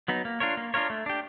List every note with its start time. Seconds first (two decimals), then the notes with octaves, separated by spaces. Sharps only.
0.08 F#3 B3 D#4
0.25 A#3
0.40 D4 F4 A#4 C#5
0.57 A#3
0.74 D4 F4 A#4 C#5
0.90 A3
1.06 D4 G4